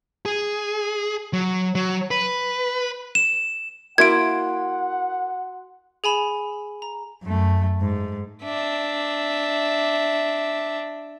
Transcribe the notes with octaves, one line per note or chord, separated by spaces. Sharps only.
G#4
F#3
F#3
B4
E7
A#3 E4 F#4 F#5 C6 G#6 D7
G#4 G#5 B5 E7
A#5
F#2 A3
G#2
D4 E5